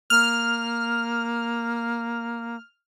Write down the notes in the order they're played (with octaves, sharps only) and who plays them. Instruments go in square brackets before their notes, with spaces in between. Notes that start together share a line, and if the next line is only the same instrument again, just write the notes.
[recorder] A#3 [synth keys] F6